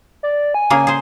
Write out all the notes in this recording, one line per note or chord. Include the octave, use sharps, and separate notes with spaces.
D5
G#5
C#3 A#3 G#4
G#4 C5